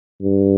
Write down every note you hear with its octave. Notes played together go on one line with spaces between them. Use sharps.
G2